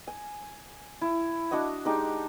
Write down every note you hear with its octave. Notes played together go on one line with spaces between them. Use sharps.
G#5
E4
D4 F#4 D#5 F#5
G#3 D4 D#4 G4